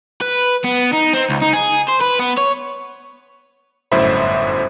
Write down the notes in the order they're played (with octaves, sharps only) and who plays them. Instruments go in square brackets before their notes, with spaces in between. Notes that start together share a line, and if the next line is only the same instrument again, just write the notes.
[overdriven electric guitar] B4
B3
D#4
C4
C#2
D#4
G#4
C5
B4
B3
C#5
[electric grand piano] G1 F#2 A2 C5 E5 B5